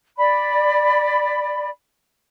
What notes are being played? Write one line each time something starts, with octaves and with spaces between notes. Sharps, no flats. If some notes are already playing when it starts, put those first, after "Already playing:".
D5 B5